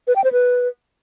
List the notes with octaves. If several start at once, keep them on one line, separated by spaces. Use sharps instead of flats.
B4
G5
C5
B4